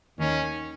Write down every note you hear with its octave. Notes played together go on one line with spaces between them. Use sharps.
D#2 D#3 C#4